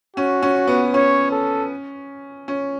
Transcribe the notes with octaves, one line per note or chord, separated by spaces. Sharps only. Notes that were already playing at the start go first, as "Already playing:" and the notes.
C#4 F#4
C#4
B3
C#4 C#5
A4
C#4